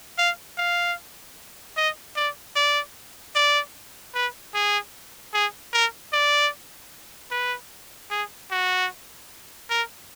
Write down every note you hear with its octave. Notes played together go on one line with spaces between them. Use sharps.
F5
F5
D#5
D5
D5
D5
B4
G#4
G#4
A#4
D5
B4
G#4
F#4
A#4